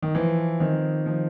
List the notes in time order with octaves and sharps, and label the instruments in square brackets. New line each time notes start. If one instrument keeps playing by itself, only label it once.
[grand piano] D#3
[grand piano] E3 [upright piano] F3
[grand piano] D#3 [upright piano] C4
[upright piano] F3